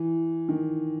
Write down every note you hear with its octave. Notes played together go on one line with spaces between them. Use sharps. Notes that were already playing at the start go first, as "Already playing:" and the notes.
Already playing: E3
D#3